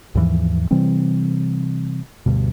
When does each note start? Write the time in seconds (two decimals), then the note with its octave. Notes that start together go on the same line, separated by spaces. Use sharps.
0.15 D#2 G#2 E3 F3
0.71 C3 E3 G3 C4
2.26 D2 G2 B2